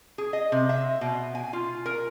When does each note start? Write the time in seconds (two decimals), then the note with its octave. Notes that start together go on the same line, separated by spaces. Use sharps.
0.18 G#4
0.33 D#5
0.52 C3
0.69 E5
1.01 B2
1.35 G#5
1.53 F4
1.86 A#4